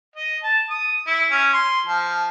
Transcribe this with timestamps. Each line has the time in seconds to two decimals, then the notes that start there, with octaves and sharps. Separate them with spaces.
0.15 D#5
0.43 A5
0.70 D#6
1.07 E4
1.31 C#4
1.53 C6
1.86 F3